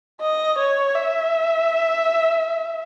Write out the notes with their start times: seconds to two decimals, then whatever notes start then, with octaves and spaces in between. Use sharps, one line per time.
0.21 D#5
0.58 C#5
0.95 E5